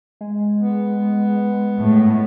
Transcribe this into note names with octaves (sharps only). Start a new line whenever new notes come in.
G#3
B3
A2